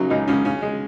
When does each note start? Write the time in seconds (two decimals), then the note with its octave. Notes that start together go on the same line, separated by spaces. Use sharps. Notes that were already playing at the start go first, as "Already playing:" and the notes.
Already playing: A#1 C#3 F#3 D#4
0.10 C#2 D#4
0.28 C#2 C#4
0.45 C#3 C#4
0.62 G#3